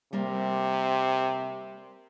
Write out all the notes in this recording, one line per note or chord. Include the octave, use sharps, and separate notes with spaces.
C3 G3 A#3 A#4